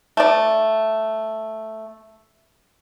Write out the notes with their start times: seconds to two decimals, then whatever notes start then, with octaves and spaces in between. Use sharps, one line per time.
0.17 A3 D5